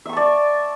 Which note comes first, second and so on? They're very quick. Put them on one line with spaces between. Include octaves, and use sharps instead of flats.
E5 C#6 A5 D5